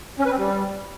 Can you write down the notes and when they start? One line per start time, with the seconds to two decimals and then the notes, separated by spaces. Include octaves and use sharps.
0.19 C#4
0.25 B4
0.31 C4
0.37 G3